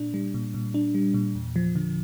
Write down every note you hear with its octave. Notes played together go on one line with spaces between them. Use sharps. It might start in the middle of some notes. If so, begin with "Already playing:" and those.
Already playing: A#2 D4
G3
A#2
A#2
D4
G3
A#2
E2
F3
D3